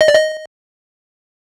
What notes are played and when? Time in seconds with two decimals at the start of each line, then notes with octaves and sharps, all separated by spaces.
0.01 D#5
0.08 D5
0.15 D#5